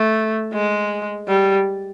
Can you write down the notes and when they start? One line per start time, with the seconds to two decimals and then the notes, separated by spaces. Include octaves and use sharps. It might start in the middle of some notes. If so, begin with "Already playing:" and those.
Already playing: A3
0.53 G#3
1.28 G3